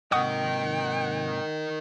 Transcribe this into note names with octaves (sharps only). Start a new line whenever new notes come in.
G#2 C3 A#4 D#5 F#5 G5 C#6 D#6